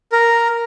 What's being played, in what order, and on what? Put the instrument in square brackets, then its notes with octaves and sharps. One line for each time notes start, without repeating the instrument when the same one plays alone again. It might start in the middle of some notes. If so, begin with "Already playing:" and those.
[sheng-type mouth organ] A#4